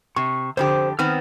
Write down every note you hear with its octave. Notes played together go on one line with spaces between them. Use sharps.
C3 C#6
F2 D3 G4 C5
D#3 B3 C4 F6